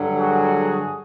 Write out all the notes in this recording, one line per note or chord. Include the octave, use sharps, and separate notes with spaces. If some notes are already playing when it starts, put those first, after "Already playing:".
Already playing: G2 D3 F#3
F#4 G#4